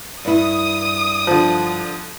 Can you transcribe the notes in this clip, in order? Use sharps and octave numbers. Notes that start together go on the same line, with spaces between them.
G2 E4 D#6
D3 F3